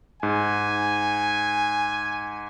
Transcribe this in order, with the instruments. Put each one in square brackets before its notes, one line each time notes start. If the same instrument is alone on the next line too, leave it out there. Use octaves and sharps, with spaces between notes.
[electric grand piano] G#2 [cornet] G#5